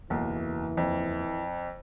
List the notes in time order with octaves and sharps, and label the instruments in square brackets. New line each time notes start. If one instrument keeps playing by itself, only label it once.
[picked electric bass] F#1 E2 A#3 [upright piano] B1 [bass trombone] E3
[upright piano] F2